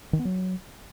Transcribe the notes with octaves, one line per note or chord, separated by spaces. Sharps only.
D#3
B3
F#3